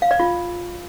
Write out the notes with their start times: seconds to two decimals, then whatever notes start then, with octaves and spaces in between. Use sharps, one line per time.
0.02 F5
0.11 D5
0.20 F4